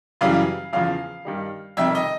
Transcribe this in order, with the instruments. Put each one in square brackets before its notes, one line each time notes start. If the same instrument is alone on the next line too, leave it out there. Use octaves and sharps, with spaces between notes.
[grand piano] F#2 C#3 E3 G3 F5
E2 C#3 F3 F5
G2 D#3 G3
F2 C3 D#3 G3 E5
D#5